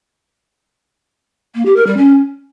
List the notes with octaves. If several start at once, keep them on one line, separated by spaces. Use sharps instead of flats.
A#3
G4
A#4
G3
C#4